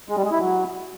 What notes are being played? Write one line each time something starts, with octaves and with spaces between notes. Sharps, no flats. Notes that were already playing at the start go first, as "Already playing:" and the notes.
G#3
G3
G#3
E4
F#3